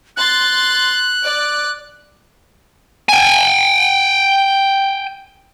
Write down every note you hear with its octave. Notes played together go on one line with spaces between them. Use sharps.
C6 F#6 A6
D5
G5 G#5